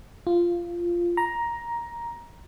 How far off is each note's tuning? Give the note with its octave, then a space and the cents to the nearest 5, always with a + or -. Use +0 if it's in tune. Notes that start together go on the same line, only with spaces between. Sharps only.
F4 -10
A#5 +10